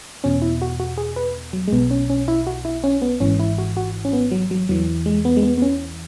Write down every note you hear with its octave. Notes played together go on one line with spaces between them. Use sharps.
E2 B2 C#4
E4
F#4
F#4
G#4
B4
F#3
G#3
B1 B2 B3
C#4
C#4
E4
F#4
E4
C#4
B3
G#1 G#2 E3 C#4
E4
F#4
F#4
C#4
B3
F#3
F#3
E2 E3 F#3
G#3
B3
G#3
B3
B3
C#4